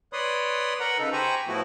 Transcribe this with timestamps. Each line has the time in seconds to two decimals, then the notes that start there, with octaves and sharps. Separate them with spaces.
0.13 B4 C#5 D5 B5 C6 D#6
0.80 A#4 B4 F#5 A#5 B5
0.98 C#3 D#4 A4 B4
1.12 G4 C5 G#5 A#5 B5 C#6
1.48 A2 F3 A3 B3 E4 F#4